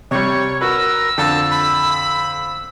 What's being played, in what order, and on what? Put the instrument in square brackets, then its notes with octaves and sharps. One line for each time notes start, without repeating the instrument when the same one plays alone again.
[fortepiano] C3 G3 [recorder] C#5 [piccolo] C#6
[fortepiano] F#4 B4 [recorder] A#4 [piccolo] E6
[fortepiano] F2 D3 [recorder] A5
[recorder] B5